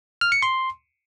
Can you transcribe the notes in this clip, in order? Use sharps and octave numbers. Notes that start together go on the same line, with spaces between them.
F6
C#7
C6